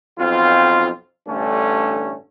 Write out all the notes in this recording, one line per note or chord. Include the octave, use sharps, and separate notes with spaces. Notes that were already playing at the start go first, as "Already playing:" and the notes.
B1 F2 C4 F4
A1 G2 D3 A3 C#4